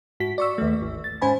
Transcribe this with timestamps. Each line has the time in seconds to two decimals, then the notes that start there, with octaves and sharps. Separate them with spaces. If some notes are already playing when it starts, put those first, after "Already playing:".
0.20 G#2 F#4 B6
0.38 D5 C#6 E6
0.58 D#2 A3
0.82 G#1
1.04 A6
1.21 G#2 C#4 C5 G#5 B5